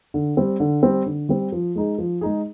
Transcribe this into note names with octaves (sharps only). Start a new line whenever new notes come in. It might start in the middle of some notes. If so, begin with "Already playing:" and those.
D3
G3 C4
D3
G3 C4
D3
G3 C4
F3
G#3 D#4 G#4
F3
G#3 D#4 G#4